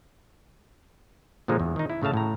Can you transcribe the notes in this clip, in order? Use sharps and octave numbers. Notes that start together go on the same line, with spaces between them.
A#2 D3 F3 G#3 D#4
E2
D#3 D#4
E4
A2 C#3 A3 F5 A5
A2 A#5